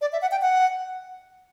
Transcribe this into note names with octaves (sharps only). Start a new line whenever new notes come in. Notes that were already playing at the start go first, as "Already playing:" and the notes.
D5
E5
F#5
G5
F#5